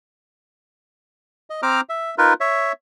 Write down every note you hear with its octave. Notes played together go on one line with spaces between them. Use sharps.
D#5
C4 C5 A#5 D6 F6
E5
D#4 F4 A#4 B4
C#5 E5